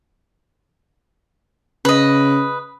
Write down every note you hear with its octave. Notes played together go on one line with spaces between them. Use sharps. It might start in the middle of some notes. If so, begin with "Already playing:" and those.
C#3 B4 D#5